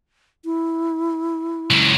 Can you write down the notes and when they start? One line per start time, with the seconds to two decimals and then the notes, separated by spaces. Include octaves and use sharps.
0.45 E4
1.71 C#2 F#3